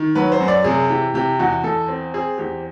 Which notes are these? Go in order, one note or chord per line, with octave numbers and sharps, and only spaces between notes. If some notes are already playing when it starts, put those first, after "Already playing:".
Already playing: D#3
F#3 B4
C5
F#2
D5
C3 G#4
E3 G4
C3 G4
E2 F#4
E2 A4
C4
C4 G#4
E2 G4